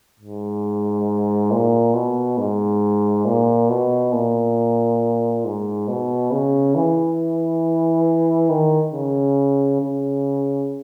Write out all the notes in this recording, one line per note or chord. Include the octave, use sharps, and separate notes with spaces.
G#2
A#2
B2
G#2
A#2
B2
A#2
G#2
B2
C#3
E3
D#3
C#3
C#3